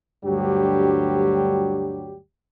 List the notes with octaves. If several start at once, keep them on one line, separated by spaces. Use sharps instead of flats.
D2 G2 F#3 G3 G4